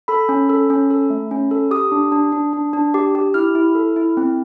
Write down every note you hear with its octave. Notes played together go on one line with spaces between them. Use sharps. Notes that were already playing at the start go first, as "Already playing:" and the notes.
A4 B5
C#4
A4
C#4
A4
A3
C#4
A4
G4 D#6
D4
D4
D4
D4
D4
G4
G4
E4 F6
E4
A4
E4
C4